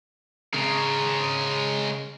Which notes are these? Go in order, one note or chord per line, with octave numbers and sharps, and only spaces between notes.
C#3 G#3 A#4